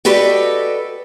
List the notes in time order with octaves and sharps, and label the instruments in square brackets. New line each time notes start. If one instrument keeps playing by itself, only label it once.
[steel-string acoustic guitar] F#4 G4 A4 B4 D5 D#5